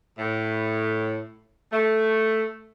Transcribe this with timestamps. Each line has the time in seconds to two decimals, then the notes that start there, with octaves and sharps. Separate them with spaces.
0.19 A2
1.72 A3